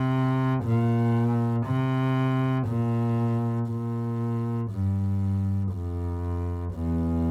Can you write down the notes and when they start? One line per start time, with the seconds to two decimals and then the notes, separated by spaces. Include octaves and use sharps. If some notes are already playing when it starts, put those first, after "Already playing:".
Already playing: C3
0.64 A#2
1.66 C3
2.68 A#2
3.69 A#2
4.72 G2
5.73 F2
6.75 E2